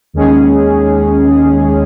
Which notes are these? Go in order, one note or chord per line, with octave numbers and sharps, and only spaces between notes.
D#2 D#3 G#3 C#4 G#4